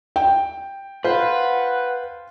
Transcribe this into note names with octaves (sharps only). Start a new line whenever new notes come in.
G5
F4 B4 C5 F#5